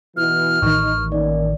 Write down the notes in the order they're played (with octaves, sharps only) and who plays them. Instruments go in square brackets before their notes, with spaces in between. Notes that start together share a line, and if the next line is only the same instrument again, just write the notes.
[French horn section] B2 E3 [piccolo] F6
[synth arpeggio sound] A1 D#3 [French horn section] D#4 [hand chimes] C#6
[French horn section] A#3 C#4 D#4 [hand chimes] D5